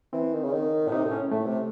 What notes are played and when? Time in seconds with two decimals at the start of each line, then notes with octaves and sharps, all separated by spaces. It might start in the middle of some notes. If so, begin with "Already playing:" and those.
0.13 E3 C4
0.33 D#3
0.44 C#3
0.53 D#3
0.87 A2
0.92 C3 D#4
1.05 A2
1.11 C#4
1.31 A2 A3
1.45 C3